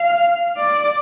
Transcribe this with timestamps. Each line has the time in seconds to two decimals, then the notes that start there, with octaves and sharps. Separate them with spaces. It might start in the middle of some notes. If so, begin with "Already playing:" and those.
Already playing: F5
0.57 D5